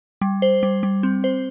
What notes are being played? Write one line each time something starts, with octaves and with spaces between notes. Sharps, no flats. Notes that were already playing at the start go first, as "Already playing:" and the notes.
G3
C5
G3
G3
C4
C5